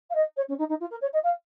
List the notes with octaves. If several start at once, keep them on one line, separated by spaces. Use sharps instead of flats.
F5
D#5
C#5
C#4
D#4
D#4
F4
A#4
C#5
D#5
F5